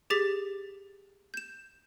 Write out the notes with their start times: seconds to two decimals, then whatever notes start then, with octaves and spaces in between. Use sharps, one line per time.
0.10 G4 G#4 D6 A6 B6
1.34 G6 E7